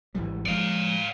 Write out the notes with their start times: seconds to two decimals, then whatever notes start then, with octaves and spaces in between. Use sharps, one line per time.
0.15 G#1 E3 G3
0.46 F3 G#3 D5 F5